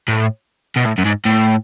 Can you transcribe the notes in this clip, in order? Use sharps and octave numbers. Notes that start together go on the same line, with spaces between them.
A2
B2
A2
F#2
G#2
A2